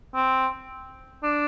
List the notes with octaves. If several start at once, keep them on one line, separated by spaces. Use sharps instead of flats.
C4
D4